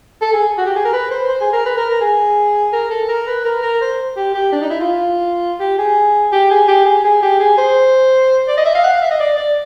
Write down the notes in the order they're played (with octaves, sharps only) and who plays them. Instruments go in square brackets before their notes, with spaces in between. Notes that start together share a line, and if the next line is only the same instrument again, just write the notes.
[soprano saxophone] A4
G#4
F#4
G4
G#4
A#4
B4
C5
C5
G#4
A#4
B4
A#4
A#4
G#4
A#4
A4
A#4
B4
A#4
A#4
C5
G4
G4
D4
D#4
E4
F4
G4
G#4
G4
G#4
G4
G#4
G#4
G4
G#4
C5
D5
D#5
E5
F5
F#5
F5
E5
D#5
D5
D5